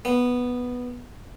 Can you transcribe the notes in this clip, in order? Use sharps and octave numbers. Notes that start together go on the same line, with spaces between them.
B3